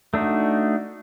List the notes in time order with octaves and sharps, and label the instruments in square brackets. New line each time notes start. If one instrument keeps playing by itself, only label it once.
[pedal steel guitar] A3 D4 D#4 F#4